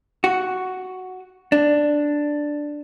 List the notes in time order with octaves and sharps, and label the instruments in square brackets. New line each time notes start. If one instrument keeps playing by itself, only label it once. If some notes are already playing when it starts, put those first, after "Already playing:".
[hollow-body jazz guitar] F#4
D4